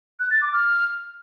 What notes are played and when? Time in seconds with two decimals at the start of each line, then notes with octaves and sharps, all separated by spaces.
0.20 F#6
0.31 A6
0.42 D6
0.53 F6